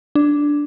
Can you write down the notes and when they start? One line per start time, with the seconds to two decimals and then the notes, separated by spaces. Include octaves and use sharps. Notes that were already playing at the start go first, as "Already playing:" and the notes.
0.15 D4